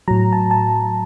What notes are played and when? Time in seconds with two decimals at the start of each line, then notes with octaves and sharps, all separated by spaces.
0.08 A2 F#3 A#5
0.33 A5
0.51 A5